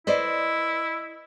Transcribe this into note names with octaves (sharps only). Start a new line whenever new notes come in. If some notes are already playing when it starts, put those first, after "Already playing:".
E4 B4 C5 D5 D#5